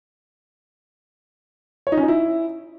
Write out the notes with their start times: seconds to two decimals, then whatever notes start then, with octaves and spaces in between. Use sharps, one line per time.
1.87 C#5
1.92 D#4
1.97 C#4
2.03 D#4
2.08 E4